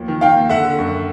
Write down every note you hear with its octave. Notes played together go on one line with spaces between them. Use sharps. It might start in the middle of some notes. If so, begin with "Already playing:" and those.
Already playing: D#2 F3
D#3
D#3 F5 G5
D#2
D3 E5 F#5
D3
F#2